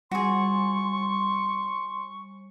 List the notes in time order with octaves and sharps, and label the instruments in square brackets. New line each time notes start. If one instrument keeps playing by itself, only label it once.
[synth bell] G3 [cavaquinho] F#4 G#4 [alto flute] C6 [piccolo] C#6